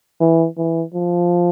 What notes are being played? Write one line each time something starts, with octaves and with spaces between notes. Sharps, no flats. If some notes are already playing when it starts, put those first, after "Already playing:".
E3
E3
F3